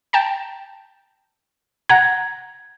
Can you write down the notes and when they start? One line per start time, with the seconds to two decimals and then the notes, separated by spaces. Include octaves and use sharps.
0.13 G5 A5 A#5
1.89 F#5 A#5 G#6